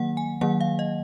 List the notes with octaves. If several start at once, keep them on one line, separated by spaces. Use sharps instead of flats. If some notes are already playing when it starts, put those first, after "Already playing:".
Already playing: D#3 F#3 A#3 F#5
G#5
D#3 F#3 A#3 F#5
F5
D#5